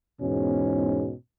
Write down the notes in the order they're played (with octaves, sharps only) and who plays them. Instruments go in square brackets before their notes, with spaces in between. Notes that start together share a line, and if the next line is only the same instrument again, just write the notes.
[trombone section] E2 G#2 B2 C#4